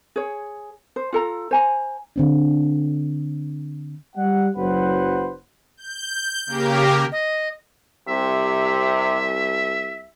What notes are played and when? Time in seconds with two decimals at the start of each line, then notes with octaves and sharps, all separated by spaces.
0.16 G#4 C#5
0.96 C5
1.13 F4 A4 A#5
1.51 C5 G#5 A#5
2.16 D3 C4 D4
4.16 G3 F#5
4.56 F#1 F#3 F#4 B4 C5 F#5
5.77 G6
6.46 C#3 A#3 G4 A#4
7.12 D#5
8.08 C2 C3 E5